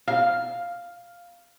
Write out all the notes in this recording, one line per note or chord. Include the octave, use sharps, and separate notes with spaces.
F5